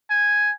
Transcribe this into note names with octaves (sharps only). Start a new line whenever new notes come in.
G#5